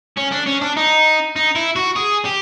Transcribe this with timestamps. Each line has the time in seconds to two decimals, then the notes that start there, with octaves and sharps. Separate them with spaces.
0.17 C#4
0.32 D4
0.47 C#4
0.62 D4
0.77 D#4
1.36 D#4
1.56 E4
1.76 F#4
1.96 G#4
2.25 G4